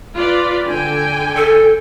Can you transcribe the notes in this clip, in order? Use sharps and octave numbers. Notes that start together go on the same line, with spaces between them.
F4 B4 D5
D3 G5 G#5
A4